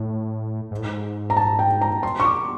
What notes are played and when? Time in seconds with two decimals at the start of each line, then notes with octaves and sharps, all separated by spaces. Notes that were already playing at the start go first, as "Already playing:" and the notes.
Already playing: A2
0.71 G#2
0.78 A2
0.85 G#2
1.30 A#5
1.37 A5
1.59 G5
1.81 A#5
2.03 C6
2.20 C#6
2.25 D6